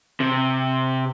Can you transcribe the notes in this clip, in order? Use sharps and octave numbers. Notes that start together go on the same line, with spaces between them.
C3